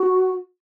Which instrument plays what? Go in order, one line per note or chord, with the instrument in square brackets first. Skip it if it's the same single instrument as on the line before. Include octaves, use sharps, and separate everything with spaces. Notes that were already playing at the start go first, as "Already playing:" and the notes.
Already playing: [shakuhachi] F#4